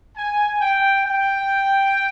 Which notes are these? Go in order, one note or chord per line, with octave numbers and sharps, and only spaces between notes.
G#5
G5
G5